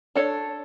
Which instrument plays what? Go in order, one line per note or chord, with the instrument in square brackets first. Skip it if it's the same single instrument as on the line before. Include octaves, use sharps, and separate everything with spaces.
[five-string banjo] D4 A4 C#5